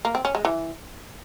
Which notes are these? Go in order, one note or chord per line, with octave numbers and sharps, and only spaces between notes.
A#3
C4
C#4
G#3
E3